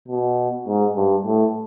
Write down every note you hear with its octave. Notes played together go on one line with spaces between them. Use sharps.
B2
G#2
G2
A2